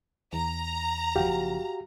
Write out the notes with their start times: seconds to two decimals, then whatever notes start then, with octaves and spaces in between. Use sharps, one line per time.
0.33 E2 A#5
1.16 F#1 F3 F#4 G4 F5